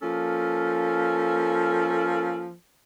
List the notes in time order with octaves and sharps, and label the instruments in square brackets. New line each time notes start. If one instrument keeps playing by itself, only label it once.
[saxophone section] F3 A#3 C#4 A4